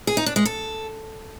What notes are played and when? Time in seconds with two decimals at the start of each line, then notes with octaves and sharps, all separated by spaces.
0.07 G#4
0.17 D#4
0.26 D4
0.36 G#3
0.45 A4